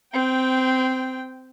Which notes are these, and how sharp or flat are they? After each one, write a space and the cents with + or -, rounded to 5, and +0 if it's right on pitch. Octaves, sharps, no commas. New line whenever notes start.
C4 -15 G5 +0